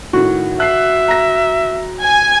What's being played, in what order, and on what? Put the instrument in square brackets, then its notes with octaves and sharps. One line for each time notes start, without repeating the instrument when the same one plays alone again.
[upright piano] A2 D#3 [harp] F#4
[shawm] E5 [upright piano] F#6 C7
[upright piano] A#5 A#6
[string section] G#5